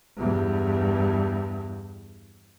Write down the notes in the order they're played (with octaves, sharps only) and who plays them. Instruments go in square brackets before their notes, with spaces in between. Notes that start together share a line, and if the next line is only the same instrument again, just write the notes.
[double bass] E2 G2